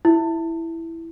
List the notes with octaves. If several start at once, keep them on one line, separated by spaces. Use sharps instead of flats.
E4